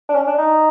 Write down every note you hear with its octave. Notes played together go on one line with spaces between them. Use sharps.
D4
C#4
D4
D#4